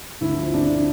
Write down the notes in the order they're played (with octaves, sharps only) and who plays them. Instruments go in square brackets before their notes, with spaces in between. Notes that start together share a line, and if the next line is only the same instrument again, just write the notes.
[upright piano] D2 E4
F3
D2 D4
D3